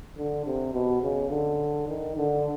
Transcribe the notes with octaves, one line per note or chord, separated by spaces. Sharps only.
D3
C3
B2
C#3
D3
D#3
D3